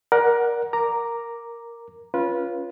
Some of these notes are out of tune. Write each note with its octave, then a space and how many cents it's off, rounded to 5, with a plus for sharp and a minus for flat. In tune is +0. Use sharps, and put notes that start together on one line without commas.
A#4 +20 D5 +0 F#5 +0
A#4 +0 A#5 +0 D6 +0
C#4 +0 F4 -5 B4 -25